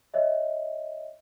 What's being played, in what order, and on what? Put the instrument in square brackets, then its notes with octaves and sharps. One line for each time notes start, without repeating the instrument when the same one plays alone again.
[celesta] C#5 D#5 E5